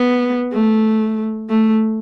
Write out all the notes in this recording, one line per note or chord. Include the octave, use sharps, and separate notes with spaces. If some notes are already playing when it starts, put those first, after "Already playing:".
Already playing: B3
A3
A3